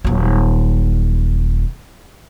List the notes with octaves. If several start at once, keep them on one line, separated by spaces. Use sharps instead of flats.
D#1 F#3